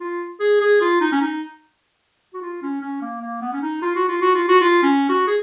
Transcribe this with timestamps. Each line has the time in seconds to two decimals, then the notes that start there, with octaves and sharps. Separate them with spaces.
0.01 F4
0.40 G#4
0.61 G#4
0.81 F4
1.01 D#4
1.12 C#4
1.21 D#4
2.34 F#4
2.42 F4
2.62 C#4
2.81 C#4
3.02 A#3
3.22 A#3
3.42 B3
3.53 C#4
3.62 D#4
3.82 F4
3.96 F#4
4.09 F4
4.21 F#4
4.35 F4
4.49 F#4
4.61 F4
4.83 C#4
5.09 F#4
5.28 G#4